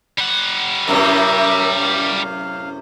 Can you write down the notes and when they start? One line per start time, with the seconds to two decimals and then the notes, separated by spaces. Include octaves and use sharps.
0.18 G3 F#5
0.88 F#2 A2 C3 A#4 E5
1.81 F5